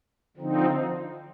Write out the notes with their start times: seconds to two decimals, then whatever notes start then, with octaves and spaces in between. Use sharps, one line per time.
0.37 D3 F3 C4 D#4